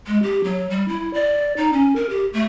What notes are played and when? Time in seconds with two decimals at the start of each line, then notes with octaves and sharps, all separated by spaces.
0.07 G#3
0.23 G4
0.44 F#3
0.70 G3
0.88 E4
1.14 D5
1.57 D#4
1.73 C#4
1.96 A#4
2.10 G4
2.33 A3